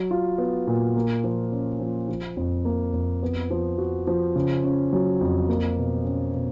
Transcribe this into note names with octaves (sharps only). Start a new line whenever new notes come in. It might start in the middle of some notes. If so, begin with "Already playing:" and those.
Already playing: F#3
F4
B3
A#2
A#3
F3
C#4
F3
F3
F2
A#3
F2
B3
F3
F#4
F3
C#3
C#4
F#3
F2
A#3
B2
C#4
B2